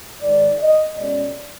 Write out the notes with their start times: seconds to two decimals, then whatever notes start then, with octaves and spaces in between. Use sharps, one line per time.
0.22 G#2 D#3 G#3 D5
0.59 D#5
0.96 B2 G#3 C#4 D5